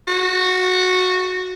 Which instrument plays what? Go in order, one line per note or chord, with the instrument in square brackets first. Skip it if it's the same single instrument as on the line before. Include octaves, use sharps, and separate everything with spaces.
[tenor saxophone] F#4